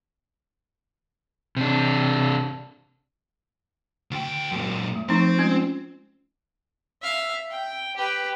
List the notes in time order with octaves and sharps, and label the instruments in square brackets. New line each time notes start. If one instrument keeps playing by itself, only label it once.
[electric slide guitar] C3 D4
[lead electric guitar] D2 G5
F#2 A#2
[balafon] A3
[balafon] F3 D#4 C#6 [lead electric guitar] C4
[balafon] G#3 C#4 F4
[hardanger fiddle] E5 F5
G5
G4 B4